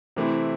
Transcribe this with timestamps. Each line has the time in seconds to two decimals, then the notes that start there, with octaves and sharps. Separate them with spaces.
0.16 C3 E3 A3 C4 E4